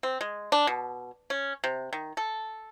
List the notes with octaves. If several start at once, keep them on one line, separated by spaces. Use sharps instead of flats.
C4
G#3
D4
B2
C#4
C3
D#3
A4